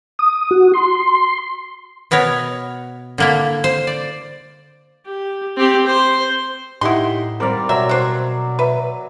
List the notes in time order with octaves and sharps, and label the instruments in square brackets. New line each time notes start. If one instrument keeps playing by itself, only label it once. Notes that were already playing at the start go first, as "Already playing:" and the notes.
[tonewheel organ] D#6
F#4
C6
[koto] B2 B3 A#4 C#5
D3 A#3 E4
C5
D5
[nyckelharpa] G4
C4 G4
C5
[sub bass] A2 [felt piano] D#4 G4 F#5 [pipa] E4 C6
[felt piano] G3 C4 [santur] A#4 D5 F5
[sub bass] B2 [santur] F#3 A#5 [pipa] E5
[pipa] D4 C5
[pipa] B4 [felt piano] E5